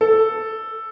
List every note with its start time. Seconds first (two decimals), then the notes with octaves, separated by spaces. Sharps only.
0.01 A4